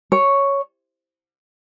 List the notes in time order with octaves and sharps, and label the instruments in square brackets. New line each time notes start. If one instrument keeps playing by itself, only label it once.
[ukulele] C#5